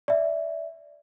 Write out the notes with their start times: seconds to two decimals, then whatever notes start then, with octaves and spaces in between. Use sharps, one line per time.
0.08 D5 E5